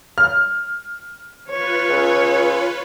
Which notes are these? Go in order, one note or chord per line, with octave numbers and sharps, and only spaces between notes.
F6
F4 B4 C#5
C#2